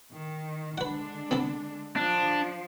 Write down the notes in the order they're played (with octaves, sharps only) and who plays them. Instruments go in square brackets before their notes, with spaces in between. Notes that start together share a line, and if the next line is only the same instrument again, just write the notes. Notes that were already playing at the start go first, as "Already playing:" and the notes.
[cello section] D#3
[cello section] D3 G#3 D4 [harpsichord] B4 F#5
[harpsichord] B3 C4 A4
[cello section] F3 [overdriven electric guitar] D4